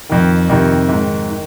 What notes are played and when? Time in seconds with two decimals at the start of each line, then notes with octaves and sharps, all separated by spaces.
0.09 F2 D#3
0.49 F2 C3 D#3
0.89 G#2 D#3
1.30 D#3